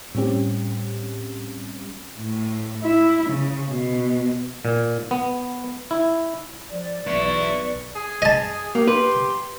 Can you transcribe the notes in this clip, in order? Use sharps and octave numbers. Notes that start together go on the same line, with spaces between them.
A2 G3 C4 C#4 G4
A2
E4
C#3
B2
A#2
B3
E4
F3 D5
B1 E2 E4 B4 C#6
G#4
D#5 A5
A#3 G4
B4 C6